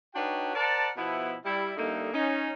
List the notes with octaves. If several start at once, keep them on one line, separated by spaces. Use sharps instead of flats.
D4 D#4 F#4 B4 C#5 G5
A#4 C5 D5 F#5 A5
B2 F3 B3 E4
G3 E4
D3 G3 A3 A#3 D#4
C#4 D#4